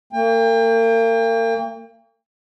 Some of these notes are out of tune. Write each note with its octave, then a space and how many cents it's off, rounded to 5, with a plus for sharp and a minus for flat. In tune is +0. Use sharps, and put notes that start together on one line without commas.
A#3 -40 G5 +35